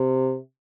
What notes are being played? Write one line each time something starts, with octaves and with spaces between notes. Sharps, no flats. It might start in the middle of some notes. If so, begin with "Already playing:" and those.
Already playing: C3